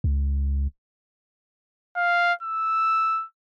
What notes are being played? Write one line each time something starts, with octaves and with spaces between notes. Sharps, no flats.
C#2
F5
E6